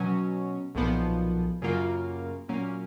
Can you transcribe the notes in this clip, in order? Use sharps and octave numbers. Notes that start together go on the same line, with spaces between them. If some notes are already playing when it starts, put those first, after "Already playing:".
Already playing: B2 F#3 C#4
B1 A#2 F3 B3
F#2 C#3 F#3 A#3 F4
A#2 F#3 A#3 C#4